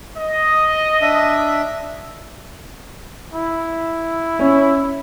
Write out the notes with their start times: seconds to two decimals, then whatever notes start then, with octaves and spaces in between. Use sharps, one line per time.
0.17 D#5
1.01 D4 E5
3.34 E4
4.39 C#4